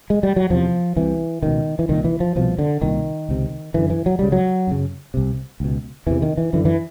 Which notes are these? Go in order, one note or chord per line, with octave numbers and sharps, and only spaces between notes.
G#3
G3
F#3
E2 C3 F3
C2 C3 E3
C#2 B2 D#3
E3
C2 A#2 D#3
E3
F3
C2 B2 F3
D3
C2 A#2 D#3
C#2 C3
F#2 D3 E3
E3
F#3
C#2 C#3 G3
F#3
F#2 C#3
C2 C3
C#2 B2
E2 C3 E3
D#3
E3
F#2 D3 E3
E3